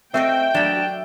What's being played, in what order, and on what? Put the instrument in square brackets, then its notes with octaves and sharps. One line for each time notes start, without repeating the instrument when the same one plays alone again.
[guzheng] A3 F#4 D#5 [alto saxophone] C4 [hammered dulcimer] E5 [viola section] G5
[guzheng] F#3 B5 [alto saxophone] D4